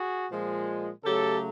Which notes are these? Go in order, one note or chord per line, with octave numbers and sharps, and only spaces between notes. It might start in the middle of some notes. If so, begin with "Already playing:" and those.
Already playing: F#4 G#4
A#2 F3 G#3
C#3 F#3 A3 G4 A4